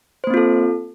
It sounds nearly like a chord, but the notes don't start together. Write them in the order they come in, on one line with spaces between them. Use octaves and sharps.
C5 A#3 C4 F4 A4